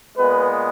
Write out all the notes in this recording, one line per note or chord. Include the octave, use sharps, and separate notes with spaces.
A#2 G#3 B3 B4